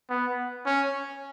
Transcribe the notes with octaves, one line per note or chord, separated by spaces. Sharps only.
B3
C#4